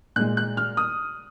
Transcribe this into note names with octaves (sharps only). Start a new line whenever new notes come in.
A#2 G#3 F#6
F#6
F6
D#6